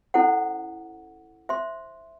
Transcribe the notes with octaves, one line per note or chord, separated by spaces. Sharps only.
C#4 E4 A4 C5 F#5
C5 E5 C6